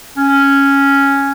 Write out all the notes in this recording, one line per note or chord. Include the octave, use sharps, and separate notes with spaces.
C#4